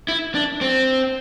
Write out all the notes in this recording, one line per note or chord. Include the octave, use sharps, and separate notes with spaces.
E4
D4
C4